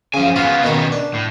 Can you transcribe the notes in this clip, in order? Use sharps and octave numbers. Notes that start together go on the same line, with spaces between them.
F#2 C#3 F3 G#5
C#3 B3 F4 F#4
B2 D#3 C#5
D4
A2